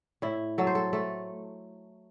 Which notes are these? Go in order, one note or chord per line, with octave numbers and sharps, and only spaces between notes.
A2 E4
F#3 A4
C5
A4
A3 A4